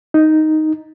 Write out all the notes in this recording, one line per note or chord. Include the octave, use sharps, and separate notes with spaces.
D#4